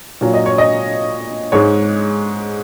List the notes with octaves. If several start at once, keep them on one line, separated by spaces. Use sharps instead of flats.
A#2 F#3
D#5
C#5
D#5
G#2 G#3 C#5